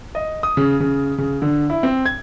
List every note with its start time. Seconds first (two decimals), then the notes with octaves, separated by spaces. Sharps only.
0.15 D#5
0.43 D#6
0.57 C#3
0.80 C#3
1.18 C#3
1.42 D3
1.70 E4
1.83 C4
2.06 G#6